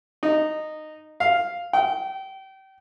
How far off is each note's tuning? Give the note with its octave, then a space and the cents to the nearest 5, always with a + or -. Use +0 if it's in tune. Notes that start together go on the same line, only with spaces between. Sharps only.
D#4 -15
F5 +0
G5 -30